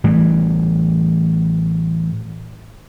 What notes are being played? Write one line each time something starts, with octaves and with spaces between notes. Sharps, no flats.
A2 E3 G3